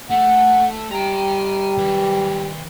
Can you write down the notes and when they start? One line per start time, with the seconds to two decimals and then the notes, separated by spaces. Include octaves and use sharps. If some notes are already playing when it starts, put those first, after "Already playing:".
0.11 A3 F#5
0.91 G3 G5 A#5
1.77 D#3 B4